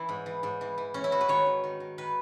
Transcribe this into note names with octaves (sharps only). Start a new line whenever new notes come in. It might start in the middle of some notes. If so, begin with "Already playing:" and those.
Already playing: E3 E4
G#2
E3
G#2
E3
E3
E3 C#4
E4
E3 F#4
B4
D#3 C#5
D#3
D#3
D#3
D#3 B4